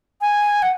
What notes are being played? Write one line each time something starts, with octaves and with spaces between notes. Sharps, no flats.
G#5
F#5